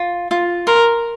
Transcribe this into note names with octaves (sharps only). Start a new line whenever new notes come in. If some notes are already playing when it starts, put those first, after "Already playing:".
Already playing: F4
F4
A#4 C6